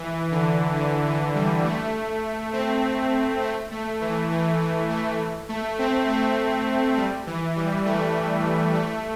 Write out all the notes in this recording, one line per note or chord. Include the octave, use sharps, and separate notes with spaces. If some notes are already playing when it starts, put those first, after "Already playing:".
Already playing: E3
D3
D3
E3
G3
A3
C4
A3
A3
E3
E3
E3
A3
A3
C4
A3
G3
E3
G3
A3
A3